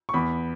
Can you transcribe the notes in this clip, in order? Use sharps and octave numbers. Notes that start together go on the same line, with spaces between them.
C#6
E2 B5